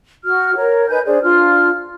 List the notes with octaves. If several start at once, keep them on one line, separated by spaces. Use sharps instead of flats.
F#4 F6
A#4 C#5
D#4 B4 G#5 G6
D4 G#4 C5 D5
D4 F4 F6